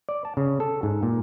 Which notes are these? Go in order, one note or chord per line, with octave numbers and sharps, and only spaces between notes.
D5
A5
C#3
A4
G#2
A#2